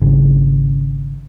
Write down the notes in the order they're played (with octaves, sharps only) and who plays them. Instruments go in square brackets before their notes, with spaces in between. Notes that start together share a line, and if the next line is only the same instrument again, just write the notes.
[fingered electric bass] G#1 C#3